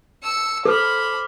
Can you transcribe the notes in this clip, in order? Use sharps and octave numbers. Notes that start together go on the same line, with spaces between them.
E6 C#7
A4 C5 B5 D6 F6